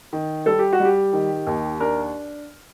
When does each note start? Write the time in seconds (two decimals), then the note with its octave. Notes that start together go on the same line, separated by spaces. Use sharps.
0.13 D#3
0.46 G3 A4
0.59 G4
0.73 F#4
0.80 G3
0.85 G4
1.13 D#3
1.47 D#2
1.80 D4 A#4